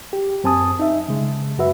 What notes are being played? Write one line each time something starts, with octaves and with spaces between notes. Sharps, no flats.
G4
F#2 C4 G#5 A5 D#6
D#4 E5
C#3 G#3
F#2 F#4 B4 E5